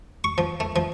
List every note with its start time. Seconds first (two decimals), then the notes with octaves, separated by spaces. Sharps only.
0.24 C#6
0.38 F3
0.60 A3
0.76 F3